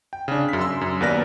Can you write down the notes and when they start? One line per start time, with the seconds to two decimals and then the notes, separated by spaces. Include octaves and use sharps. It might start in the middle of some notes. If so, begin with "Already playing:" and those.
0.13 G5
0.28 C#3 D4
0.49 F#2 B6
0.61 C6 E6
0.81 F#2
1.01 D#2 B3 A#4 B4 D5 A#6